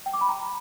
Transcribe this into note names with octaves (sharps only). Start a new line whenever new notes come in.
G5
D6
B5
A#5